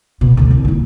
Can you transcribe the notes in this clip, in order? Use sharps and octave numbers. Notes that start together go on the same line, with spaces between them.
B2 B3
D2 B2
C2
A#2 E4